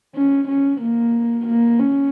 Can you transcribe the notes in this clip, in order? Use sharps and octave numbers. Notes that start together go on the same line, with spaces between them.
C#4
C#4
A#3
A#3
C#4